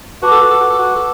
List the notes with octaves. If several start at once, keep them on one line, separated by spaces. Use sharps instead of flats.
F#4 B4 F#5 A5 D6
A4
F#4
A4
F#4
A4
F#4
A4